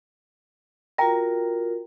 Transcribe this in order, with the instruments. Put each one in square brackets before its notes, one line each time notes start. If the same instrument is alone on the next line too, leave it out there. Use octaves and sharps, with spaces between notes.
[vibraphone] F4 F#4 A#4 [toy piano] E5 G5 A#5